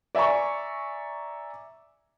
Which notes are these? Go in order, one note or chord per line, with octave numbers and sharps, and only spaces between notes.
D5 E5 G#5 A#5 C#6